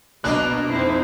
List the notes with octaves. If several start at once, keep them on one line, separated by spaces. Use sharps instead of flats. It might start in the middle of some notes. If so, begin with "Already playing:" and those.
B2 A#3 D4 D#5 F#6
F2 C4 D#4 E4 C5